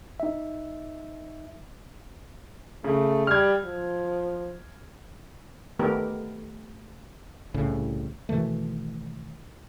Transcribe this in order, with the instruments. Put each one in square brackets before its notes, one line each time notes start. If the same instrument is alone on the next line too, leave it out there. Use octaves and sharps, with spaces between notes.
[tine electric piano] D#4 E5
[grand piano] C#3 [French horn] A3
[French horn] G3 [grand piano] F6 G#6
[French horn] F3
[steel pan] D#3 A3 B3 G4 A#4
[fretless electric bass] C2 A2 C#3
B2 D#3 E3 A3